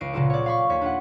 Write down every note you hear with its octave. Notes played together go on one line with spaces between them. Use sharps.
C#2 C7 D7
A#2 C#3 F#3 F4 A4
C#5 D5
F5 B5 C#6
D#2 C#5 B6
D4 F4 F#5